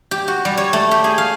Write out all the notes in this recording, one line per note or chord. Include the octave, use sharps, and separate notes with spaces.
G4
F#4
G3
C#5
A3
G4
G#4
F5